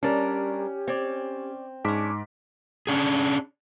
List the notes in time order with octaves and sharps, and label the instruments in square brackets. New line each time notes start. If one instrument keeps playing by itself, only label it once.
[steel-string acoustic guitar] G3 A#4 [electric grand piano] C#4 [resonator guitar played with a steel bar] D4 D5 [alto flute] G4
[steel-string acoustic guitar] C4 [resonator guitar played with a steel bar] C#5 D5
[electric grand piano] G#2 D6 B6 [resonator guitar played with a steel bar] C#4 D4
[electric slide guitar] C#4 D4 G#4